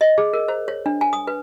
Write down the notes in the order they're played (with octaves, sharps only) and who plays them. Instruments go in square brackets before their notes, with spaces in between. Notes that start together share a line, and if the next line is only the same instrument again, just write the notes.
[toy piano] D#5
G#4
A#4
C5
C#5
D4
G#5
D#6
B4